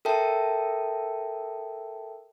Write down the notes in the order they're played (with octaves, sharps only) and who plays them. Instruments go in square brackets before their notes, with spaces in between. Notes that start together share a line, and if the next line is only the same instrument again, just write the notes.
[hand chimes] A4 A#4 E5 G5 A5